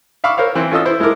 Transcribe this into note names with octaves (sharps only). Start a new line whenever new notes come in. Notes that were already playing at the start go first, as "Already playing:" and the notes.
E5 F5 B5 C#6 D6 E6
A#4 C5 C#5 F5
E3 C4 E4
C#4 F4 A4 D#5 E6
E4 C5
G#3 E4 A4 A#4 D6